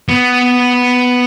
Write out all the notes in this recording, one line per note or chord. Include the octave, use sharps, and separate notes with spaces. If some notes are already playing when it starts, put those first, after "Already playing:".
B3